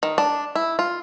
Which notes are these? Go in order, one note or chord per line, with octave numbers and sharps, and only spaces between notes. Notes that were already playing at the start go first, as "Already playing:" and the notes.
D#3
D4
E4
F4